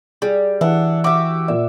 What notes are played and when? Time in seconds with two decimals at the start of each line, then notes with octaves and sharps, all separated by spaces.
0.22 G3 G#4
0.61 E3 D4 E5 F#5
1.04 F#4 G4 E5 D6
1.48 A#2 D5 E5